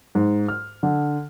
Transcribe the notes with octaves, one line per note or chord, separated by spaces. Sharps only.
G#2
F6
D3